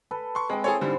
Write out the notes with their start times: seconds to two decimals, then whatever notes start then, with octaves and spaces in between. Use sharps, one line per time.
0.11 A4 B4
0.35 C6 C#6
0.50 G#3 C4 G#4 G5
0.64 E4 G#4 A4 C5 C#5
0.81 G#2 D3 G3 E4